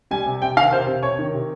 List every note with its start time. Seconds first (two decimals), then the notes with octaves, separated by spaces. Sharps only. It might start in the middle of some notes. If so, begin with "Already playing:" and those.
0.11 G3 G#5
0.26 C3
0.42 C3 G5
0.56 D#3 F5
0.72 C3 C5
0.87 C3
1.03 C3 C#5
1.19 D#3
1.34 C3